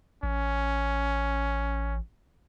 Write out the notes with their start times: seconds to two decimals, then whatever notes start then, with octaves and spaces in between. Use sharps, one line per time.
0.23 A1 C#4